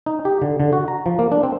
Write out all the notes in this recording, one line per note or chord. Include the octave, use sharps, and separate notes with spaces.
D#4
G4
D3
D3
F#4
A#5
F3
A#3
D4
C4